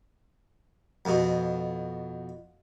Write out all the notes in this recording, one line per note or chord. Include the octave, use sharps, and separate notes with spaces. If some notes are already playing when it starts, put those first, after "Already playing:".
F2 B2